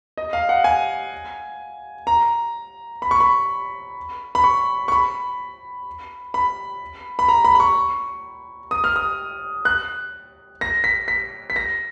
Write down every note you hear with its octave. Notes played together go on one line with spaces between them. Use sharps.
D#5
F5
F#5
G#5
A#5
B5
C#6
B5
B5
C#6
C#6
B5
B5
B5
A#5
B5
B5
C#6
D#6
F6
D#6
F#6
A#6
B6
B6
B6
A#6